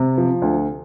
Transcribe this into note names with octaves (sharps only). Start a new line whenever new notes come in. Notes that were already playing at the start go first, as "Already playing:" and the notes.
Already playing: C3
F3
D2